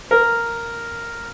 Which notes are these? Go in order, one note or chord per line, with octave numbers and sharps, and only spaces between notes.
A#4